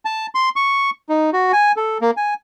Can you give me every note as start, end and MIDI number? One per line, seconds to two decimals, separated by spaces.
0.05 0.26 81
0.35 0.49 84
0.56 0.90 85
1.09 1.30 63
1.33 1.52 66
1.53 1.72 80
1.77 1.98 69
2.01 2.11 58
2.17 2.34 80